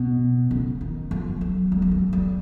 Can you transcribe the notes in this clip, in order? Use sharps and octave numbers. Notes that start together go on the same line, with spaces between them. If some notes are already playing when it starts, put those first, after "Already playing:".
Already playing: B2
C#3
D#3
F3
F#3
G3
F3
F#3
G3